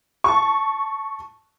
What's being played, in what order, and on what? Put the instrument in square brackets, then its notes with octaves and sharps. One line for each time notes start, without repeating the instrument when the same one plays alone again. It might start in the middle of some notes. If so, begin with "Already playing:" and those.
[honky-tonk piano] A5 C#6